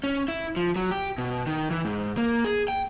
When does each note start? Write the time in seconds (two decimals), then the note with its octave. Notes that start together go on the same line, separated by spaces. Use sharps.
0.04 C#4
0.28 E4
0.56 F3
0.76 F#3
0.91 G4
1.18 B2
1.46 D#3
1.71 E3
1.85 G#2
2.18 A#3
2.44 G#4
2.68 G5